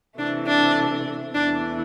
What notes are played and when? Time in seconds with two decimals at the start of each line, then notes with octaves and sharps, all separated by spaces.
0.18 C3 E3 A3 D4
0.47 D4
1.34 E2 E3 A3 D4